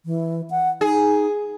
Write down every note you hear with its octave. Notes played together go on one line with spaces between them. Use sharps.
E3
F#5
D#4 G#4